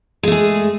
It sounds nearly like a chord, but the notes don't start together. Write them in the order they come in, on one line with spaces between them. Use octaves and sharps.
G#3 A3 G#4